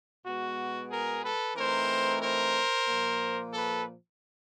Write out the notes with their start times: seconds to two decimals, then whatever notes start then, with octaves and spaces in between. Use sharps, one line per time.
0.24 B2 G#3 B3 F#4
0.90 G#4 A#4
1.23 A4 B4
1.56 E3 A3 C4 D#4 A#4 C5
2.22 A#4 C5
2.88 A#2 F3 A#3
3.54 A4 B4